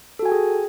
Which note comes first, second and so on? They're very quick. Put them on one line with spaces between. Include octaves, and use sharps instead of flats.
A4 F#4 G#5 G5 G#4